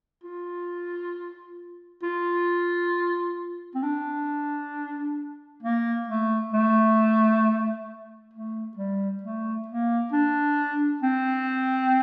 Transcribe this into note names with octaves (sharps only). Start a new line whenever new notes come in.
F4
F4
C4
D4
A#3
A3
A3
A3
G3
A3
A#3
D4
C4